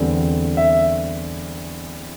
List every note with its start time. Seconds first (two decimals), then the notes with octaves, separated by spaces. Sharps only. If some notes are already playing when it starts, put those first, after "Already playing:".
Already playing: E2 D3 G3 C4
0.57 E5